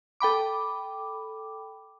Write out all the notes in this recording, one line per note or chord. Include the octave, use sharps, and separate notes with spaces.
A4 G5 B5 D6